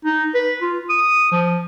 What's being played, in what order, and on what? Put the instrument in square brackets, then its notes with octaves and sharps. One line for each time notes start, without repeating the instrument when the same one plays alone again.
[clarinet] D#4
B4
F4
D#6
F3